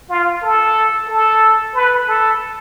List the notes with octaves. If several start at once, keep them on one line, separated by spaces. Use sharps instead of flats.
F4
A4
A4
B4
A4